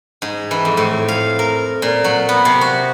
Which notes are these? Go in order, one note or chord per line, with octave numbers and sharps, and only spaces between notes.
G#2
E3
F2
A2
F5
A#4
A#2
F#3
B3
C3
F#4